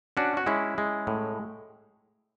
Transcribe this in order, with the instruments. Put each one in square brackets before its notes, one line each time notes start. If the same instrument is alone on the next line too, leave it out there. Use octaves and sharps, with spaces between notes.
[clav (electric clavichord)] C#4 D4 F#4
F#4
G#3 C#4 E4
G#3
A2